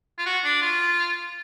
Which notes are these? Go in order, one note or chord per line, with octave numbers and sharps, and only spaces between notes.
F4
F#4
D4
F4